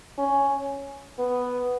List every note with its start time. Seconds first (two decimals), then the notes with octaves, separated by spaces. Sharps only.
0.18 C#4
1.19 B3